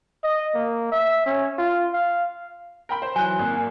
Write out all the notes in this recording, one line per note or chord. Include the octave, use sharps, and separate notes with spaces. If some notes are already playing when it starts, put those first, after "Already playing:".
D#5
A#3
E5
C#4
F4
F5
A#4 G5 B5
C5
E3 F#3 G#5 F#6
G#1 A#3